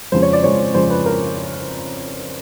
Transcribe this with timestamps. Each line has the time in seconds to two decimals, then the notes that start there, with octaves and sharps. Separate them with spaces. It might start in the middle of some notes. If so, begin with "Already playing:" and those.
0.12 F2 C#3 F3 G#3 C4 C5
0.22 C#5
0.33 D5
0.44 F2 C#3 F3 G#3 C4 C#5
0.74 F2 C#3 F3 G#3 C4 C5
0.90 B4
1.06 A#4